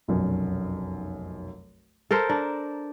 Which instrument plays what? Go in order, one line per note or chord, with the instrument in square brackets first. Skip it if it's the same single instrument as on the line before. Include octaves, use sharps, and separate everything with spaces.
[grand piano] F1 B1 F#2
[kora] A4 A#4 C5
[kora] D4 [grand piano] A#5